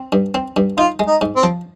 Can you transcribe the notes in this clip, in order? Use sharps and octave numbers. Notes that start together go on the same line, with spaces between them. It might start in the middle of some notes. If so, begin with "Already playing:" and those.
Already playing: C4
G2
C4
G2
D#4 F4
G#3
D#4
G#2
C4
F3